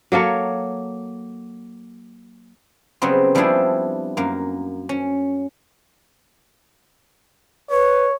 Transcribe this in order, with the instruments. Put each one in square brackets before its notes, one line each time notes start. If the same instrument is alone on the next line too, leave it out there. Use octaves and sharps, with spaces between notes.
[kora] F#3 A#3 A4 C#5
[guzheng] C#3 F#3 G3 B3 C4
F3 G3 A3 D4 E4 G#4
F#2 A#3
C#4
[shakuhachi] B4 [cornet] C#5